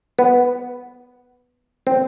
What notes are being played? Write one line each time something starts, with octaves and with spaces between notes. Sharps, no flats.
B3
C4